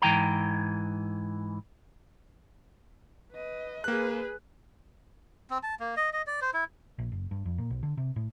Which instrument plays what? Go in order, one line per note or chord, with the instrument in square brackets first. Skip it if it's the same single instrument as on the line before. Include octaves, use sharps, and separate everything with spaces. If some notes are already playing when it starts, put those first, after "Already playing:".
[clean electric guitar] G#2 E3 G5 A#5
[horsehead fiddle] B4 D#5
[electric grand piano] A#3 F#6 [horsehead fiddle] G#4 B4
[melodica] C4
A5
A#3
D#5
D#5
D5
C5
E4
[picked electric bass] A#1
F#1
G2
F2
A#2
B1
D3
C3
A2